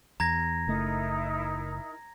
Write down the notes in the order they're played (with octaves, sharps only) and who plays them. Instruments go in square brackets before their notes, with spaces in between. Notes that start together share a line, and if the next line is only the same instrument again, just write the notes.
[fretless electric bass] E2 [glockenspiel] A#5 G#6 A#6
[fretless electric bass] F#1 C#3 A3 [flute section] D#4 E4 A#4